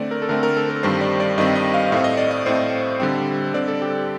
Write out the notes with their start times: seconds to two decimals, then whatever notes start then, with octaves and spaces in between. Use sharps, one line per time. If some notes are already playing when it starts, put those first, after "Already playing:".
Already playing: D3 A3 C4 D5
0.11 A#4
0.22 A4
0.29 D3 A3 C4 A#4
0.43 A#4
0.57 A4
0.70 A#4
0.83 G2 D#3 G3 C4 C5
1.01 D5
1.20 D5
1.38 G2 D#3 G3 C4 D#5
1.56 D#5
1.74 F5
1.92 A2 A3 C4 F5
2.04 D#5
2.17 D5
2.31 D#5
2.46 A2 A3 C4 C5
3.00 D3 G3 C4
3.54 D3 G3 C4 D5
3.68 A4
3.82 G4